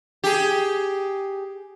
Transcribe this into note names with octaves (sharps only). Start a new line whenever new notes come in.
G4 G#4